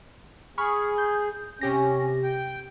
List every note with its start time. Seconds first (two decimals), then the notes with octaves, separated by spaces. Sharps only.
0.58 G#4 B5 C#6 F6
0.98 G6
1.61 C3 C#4 G4 A#6
2.23 G5